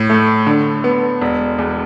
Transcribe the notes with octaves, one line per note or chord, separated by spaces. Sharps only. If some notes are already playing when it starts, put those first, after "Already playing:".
Already playing: A2
A3
D3
B3
E1
E2